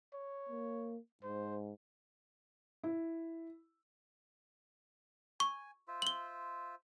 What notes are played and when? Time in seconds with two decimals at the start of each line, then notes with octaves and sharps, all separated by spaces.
0.14 C#5
0.49 A#3
1.23 G#2 C5
2.83 E4
5.40 G#5 C#6
5.88 F4 C5 E5
6.02 F#7 G7